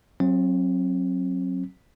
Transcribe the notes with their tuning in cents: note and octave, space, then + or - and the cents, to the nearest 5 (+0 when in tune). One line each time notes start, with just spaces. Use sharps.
F#3 +0 C4 +40